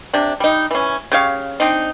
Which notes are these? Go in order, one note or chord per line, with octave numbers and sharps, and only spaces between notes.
C3 D4
G3 D#4
E3 C#4
C#3 G4 C#5 F5
C4 D4 D#4